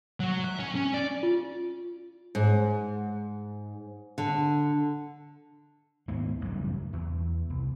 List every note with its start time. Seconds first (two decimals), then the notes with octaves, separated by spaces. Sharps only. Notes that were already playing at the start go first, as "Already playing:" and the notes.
0.20 F#3
0.44 E5
0.59 C#4
0.75 C#4
0.94 D5
1.23 F4
2.35 G#2
4.18 D3
6.08 D#2 G#2 G#3 B3
6.41 A1 F#2 C#3 G3
6.93 E2
7.50 C2